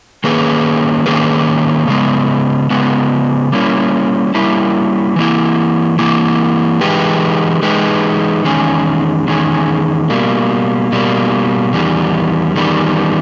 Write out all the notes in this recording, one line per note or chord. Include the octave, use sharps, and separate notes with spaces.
D#3 A#3 C#4 G#4 B4
D#3 A#3 C#4 G#4 B4
C#3 G#3 B3
C#3 G#3 B3
G3 A#3 C#4 E4
G3 A#3 C#4 E4
E3 A#3 E4
E3 A#3 E4
E3 G#3 D#4 G4 B4
E3 G#3 D#4 G4 B4
E2 D#3 G#3 C#4 G#4
E2 D#3 G#3 C#4 G#4
B2 G3 A#3
B2 G3 A#3
E2 D#3 G3
E2 D#3 G3